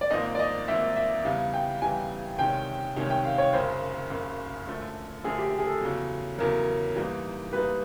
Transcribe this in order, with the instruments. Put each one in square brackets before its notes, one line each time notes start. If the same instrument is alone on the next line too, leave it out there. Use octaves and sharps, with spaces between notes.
[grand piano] D5
[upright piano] G#1 G#2 F3 A#3 [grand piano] D#5
[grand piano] D5
D#5
[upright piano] G#1 G#2 F3 A#3 [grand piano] E5
[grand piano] E5
[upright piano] E2 C#3 E3 G3 [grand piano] F5
[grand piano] G5
[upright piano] E2 C#3 E3 G3 [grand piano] G#5
[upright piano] C2 C3 D#3 G#3 C#4 [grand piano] G5
[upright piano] C2 C3 D#3 G#3 C#4
[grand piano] G5
F5
C#5
[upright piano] F#1 F#2 C#3 [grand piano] C5
[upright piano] F#1 F#2 C#3
F#2 D3 F3 A3
[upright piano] F#2 D3 F3 A3 [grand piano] G#4
[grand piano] G4
G#4
A4
[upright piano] E2 C#3 F#3
[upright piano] E2 C#3 F#3 [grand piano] A#4
[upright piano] G#2 E3 G3 A#3 D#4
[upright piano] G#2 E3 G3 A#3 D#4 [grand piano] B4